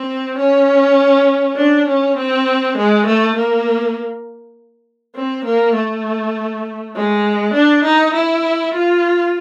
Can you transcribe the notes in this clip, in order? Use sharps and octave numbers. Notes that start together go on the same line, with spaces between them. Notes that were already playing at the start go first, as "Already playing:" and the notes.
Already playing: C4
C#4
D4
C#4
C4
G#3
A3
A#3
C4
A#3
A3
G#3
D4
D#4
E4
F4